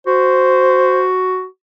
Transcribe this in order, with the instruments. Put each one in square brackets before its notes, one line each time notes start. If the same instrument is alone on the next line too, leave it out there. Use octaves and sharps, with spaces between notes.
[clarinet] F#4 [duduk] C5